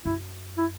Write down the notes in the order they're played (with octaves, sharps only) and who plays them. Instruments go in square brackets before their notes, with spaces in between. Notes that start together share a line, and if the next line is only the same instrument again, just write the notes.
[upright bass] F#2 [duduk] E4
[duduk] E4